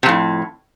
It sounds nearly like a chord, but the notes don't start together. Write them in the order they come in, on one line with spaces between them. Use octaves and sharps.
C3 F2 A2